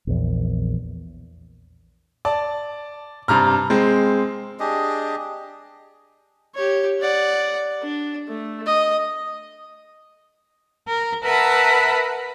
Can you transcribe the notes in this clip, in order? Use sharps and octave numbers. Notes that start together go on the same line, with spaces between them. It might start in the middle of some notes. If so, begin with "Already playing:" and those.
A#1 E2
D5 A5
G2 C3 A#5 F6
G#3 C4
D4 G4 G#4 D#5
G4 C#5
D5 F#5
D4
A3
D#5
A#4
A#4 B4 E5 F#5 A5 B5